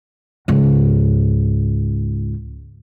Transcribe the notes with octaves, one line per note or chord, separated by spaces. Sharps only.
C#2 G#2